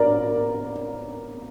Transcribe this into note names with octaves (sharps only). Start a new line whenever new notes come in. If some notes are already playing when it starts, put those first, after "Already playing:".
Already playing: A#4 D5